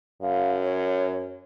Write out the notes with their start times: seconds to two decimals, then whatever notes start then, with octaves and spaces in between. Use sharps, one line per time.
0.22 F#2 F5
0.63 C#5